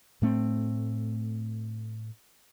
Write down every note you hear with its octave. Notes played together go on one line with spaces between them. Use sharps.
A2 A3 C4